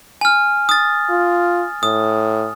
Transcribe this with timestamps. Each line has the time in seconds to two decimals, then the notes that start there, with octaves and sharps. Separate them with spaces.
0.21 G#5 F6
0.69 D#6 A6
1.10 F4
1.83 A2 D#6